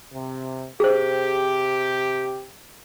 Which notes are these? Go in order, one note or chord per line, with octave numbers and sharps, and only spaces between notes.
C3
C3 G4 G#4 C5